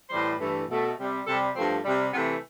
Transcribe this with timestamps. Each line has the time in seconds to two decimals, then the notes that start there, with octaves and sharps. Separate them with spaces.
0.09 A2 E3 G3 C5
0.39 G2 E3 A3
0.68 B2 A3
0.98 C3 G3
1.26 C3 G3 A4
1.56 G2 F3 A3 C4
1.84 C3 G3
2.13 C3 E3 A3 B3